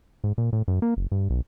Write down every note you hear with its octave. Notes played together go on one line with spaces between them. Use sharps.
G#2
A#2
A2
F#2
A#3
F#1
G2
B1